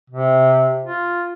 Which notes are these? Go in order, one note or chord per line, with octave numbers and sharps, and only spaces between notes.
C3
F4